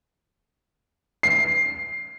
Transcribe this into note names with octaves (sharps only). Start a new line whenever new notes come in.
C7